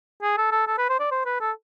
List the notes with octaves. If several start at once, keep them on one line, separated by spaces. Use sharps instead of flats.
G#4
A4
A4
A4
B4
C5
D5
C5
B4
A4